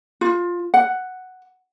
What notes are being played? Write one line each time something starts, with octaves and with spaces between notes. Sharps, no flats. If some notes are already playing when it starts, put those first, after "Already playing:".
F4
F#5